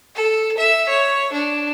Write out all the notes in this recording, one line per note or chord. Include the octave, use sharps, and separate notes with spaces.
A4
E5
C#5
D4